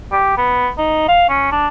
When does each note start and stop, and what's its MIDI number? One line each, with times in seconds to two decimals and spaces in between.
0.12 0.36 67
0.37 0.69 59
0.78 1.08 63
1.08 1.29 77
1.29 1.50 61
1.51 1.68 62